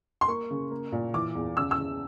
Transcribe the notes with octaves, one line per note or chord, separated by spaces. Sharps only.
C6
A#3 C#6
C#3
A#3
A#2
E3 D6
E2
C#3 E6
E6
C#3